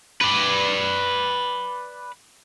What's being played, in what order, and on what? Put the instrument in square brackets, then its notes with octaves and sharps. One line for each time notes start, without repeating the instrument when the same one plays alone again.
[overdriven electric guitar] B4 D5